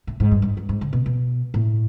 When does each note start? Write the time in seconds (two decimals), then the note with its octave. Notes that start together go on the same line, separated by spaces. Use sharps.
0.07 A2
0.20 G#2
0.31 G2
0.42 G#2
0.57 G2
0.69 G#2
0.81 D3
0.93 B2
1.06 B2
1.54 A2